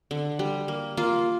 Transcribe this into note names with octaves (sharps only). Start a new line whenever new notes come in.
D3
G3
A#3
A#3 F4